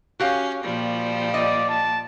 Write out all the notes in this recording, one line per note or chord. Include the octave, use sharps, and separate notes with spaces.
C#4 F#4 G4 F5
A#2 F3 G3
D5 D#5
A5